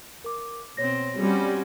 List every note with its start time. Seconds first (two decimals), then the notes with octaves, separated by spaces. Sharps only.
0.24 A#4 D6
0.77 B2 C4 C#5 A#6
1.19 G3 C4 C#4 F#4